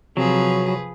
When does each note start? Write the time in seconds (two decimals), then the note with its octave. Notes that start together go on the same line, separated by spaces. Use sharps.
0.17 C3 F3 F#3 G#4 B4